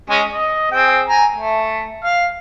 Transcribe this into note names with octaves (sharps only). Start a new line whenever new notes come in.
G#3 C#4 G#4
D#5
C4 G#4 G5
G#5 A#5
A3
F5